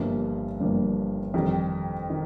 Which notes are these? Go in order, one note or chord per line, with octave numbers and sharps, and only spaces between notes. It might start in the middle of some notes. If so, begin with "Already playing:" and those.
Already playing: G1 G2 F3 A#3
G1 G2 F3 A#3
F2 D#3 G3
D#3